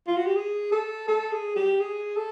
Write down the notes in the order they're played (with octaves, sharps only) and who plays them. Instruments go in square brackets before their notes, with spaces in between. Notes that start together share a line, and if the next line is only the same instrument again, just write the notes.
[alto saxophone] F4
F#4
G4
G#4
A4
A4
G#4
G4
G#4
A4